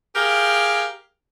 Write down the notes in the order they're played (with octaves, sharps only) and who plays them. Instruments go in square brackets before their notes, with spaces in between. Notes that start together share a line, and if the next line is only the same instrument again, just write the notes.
[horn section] G4 G#4 A#4 F5 G5